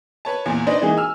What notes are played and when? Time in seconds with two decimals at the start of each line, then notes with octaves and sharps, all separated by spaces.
0.25 B4 C#5 A5
0.46 E2 A#2
0.67 D4 D#4 B4 C5 D5 D#5
0.82 E3 G#3 A#3 D#4 G#4
0.97 G#5 E6 F6